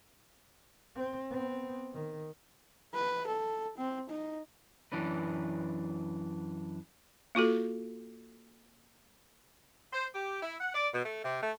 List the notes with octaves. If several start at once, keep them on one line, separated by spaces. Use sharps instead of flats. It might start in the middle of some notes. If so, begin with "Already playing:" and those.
C4
B3 C4
D#3
B4
A4
C4
D#4
F#2 E3 D4 B4
A#3 F4 F#4 A4
C5
G4
E4
F#5
D5
B2
A3
C3
A3